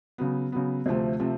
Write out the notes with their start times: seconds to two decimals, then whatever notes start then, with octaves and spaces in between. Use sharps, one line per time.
0.18 C#3 F#3 B3
0.52 C#3 F#3 B3
0.86 D2 C3 F3 A3 C4
1.20 C3 F3 A3 C4